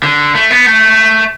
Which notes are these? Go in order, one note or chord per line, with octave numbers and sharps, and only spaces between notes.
D3
A3
B3
A3